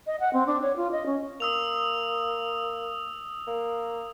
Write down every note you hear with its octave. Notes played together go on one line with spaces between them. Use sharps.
D#5
F#5
C4
D4
C#5
F4
D#5
C#4
A#3 D#6 E6 F7
A#3